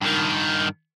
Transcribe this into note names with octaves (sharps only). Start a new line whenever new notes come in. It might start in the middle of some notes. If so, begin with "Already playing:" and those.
G2 D#3